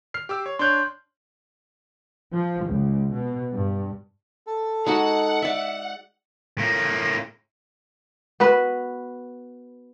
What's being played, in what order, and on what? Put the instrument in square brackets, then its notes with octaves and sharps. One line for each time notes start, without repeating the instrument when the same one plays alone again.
[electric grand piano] F6 C7
G4 D6 E6
C#5
[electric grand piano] D4 C#5 F#6 [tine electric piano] C6 G6
[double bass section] F3
C#2
B2
G2
[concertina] A4
[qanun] G#3 D#4 F#4 [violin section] F#5
[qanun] D5 E5
[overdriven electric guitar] A2 A#3
[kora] B3 F#4 B4